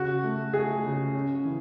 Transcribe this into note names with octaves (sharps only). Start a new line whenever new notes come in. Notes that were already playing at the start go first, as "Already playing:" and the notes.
Already playing: C#3 F#4
A3
A3 G#4
C#3
C#4
E3